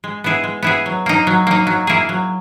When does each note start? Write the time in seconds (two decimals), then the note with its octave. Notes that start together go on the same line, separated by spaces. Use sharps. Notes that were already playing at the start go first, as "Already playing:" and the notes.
0.04 G#3
0.24 B3 E4 G#4
0.44 G#3
0.63 B3 E4 G#4
0.86 F#3
1.06 A#3 D#4
1.27 F#3
1.47 A#3 D#4
1.67 F#3
1.87 A#3 E4 G#4
2.09 F#3